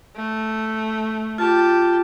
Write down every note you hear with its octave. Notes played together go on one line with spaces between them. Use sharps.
A3
F4 G4 A5